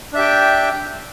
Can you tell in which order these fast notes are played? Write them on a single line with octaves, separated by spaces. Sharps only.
D4 E5 G4 G5